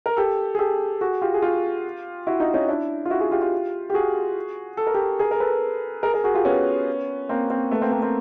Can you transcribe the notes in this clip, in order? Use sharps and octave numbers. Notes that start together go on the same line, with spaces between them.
A#4
G4 A4
G#4
G4 A4
F#4 G#4
F4 G4
G#4
F4 G4
E4 F#4
D#4 F4
C#4 D#4
D4 E4
F4
E4 F#4
F#4 G#4
F4 G4
F4 G4
G4
F#4 G#4
A4
A#4
G4 A4
G#4 A#4
A#4
A4 B4
G#4 A#4
G#4 A#4
F#4 G#4
F4 G4
B3 C#4
A#3 C4
A#3 C4
A3 B3
A#3 C4
A#3 C4
A#3 C4